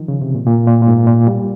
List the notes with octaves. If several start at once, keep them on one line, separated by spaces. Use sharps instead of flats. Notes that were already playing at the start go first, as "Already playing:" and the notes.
Already playing: D#3 F3
C#3
C3
A#2
A#2
A#2
A#2
G#2
A#2
G3